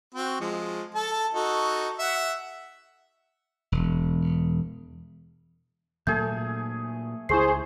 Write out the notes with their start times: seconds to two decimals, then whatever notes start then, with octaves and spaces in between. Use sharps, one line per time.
0.15 C4 F#4
0.41 F3 G#3
0.95 A4 A5
1.34 D#4 F#4 A4
1.99 E5 F#5
3.72 E1
6.07 A#2 F#3 A3 A#3 G#4 G6
7.29 C#2 E4 G#4 C5 C#6 C7